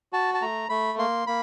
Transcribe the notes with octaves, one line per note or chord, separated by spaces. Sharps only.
F#4 A5
A5
A3 A#5
A3 B5
A#3 C6
A#3 B5